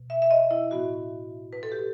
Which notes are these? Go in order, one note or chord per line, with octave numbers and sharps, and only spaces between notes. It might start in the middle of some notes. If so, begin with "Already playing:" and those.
Already playing: B2
E5
E5
D#5
E4
A2 E3 B3 F#4
B4
A4
G4